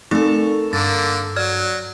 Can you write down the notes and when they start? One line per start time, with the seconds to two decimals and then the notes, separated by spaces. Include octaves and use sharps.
0.11 A3 C4 D#4 A4 A#4 C#6
0.73 G2 D3 A#3 A6
1.36 F#3 D5 F6 G#6